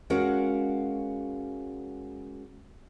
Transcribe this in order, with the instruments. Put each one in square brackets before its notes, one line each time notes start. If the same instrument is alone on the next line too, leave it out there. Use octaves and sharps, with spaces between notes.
[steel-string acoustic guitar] G#3 C#4 F#4 A#4 F5 F#5